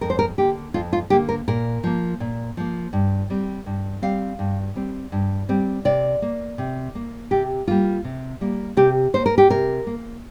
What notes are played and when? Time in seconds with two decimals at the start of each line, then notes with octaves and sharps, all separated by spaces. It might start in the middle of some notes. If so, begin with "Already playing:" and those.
0.01 F2 A#4
0.10 C5
0.19 A#4
0.38 D3 A#3 G4
0.74 F2 F4
0.93 F4
1.10 D3 A#3 G4
1.29 A#4
1.48 A#2 A#4
1.84 F3 A#3
2.20 A#2
2.57 F3 A#3
2.93 G2
3.30 G3 C4
3.66 G2
4.02 G3 C4 F5
4.39 G2
4.76 G3 C4
5.12 G2
5.49 G3 C4
5.85 C3 D5
6.22 A#3
6.58 C3
6.95 A#3
7.31 C3 G4
7.67 G3 A#3 F4
8.04 C3
8.41 G3 A#3
8.77 C3 G4
9.14 A#3 C5
9.26 A#4
9.38 G4
9.50 C3 A#4
9.87 A#3